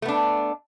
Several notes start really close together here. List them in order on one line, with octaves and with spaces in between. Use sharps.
A3 B3 D4